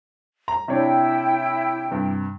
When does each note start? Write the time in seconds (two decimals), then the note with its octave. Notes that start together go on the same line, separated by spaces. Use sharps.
0.48 A#5
0.68 C3 D4 E4 C#5 G5
1.91 G2 C3